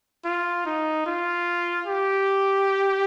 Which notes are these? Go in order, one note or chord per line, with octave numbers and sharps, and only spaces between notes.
F4
D#4
F4
G4